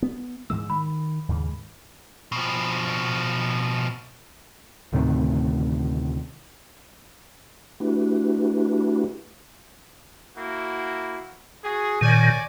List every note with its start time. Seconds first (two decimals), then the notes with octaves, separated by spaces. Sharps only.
0.02 B3
0.50 G#2 E3 G#3 E6
0.70 D#3 B5
1.28 D#2 G#2 C#3
2.32 B2 F3
4.93 D2 A2 C3 D#3
7.80 A3 D4 E4 F#4 G4 B4
10.37 A#3 E4 F#4
11.64 F#4 G#4
12.01 A#2 D#3 C#5 D5 G#5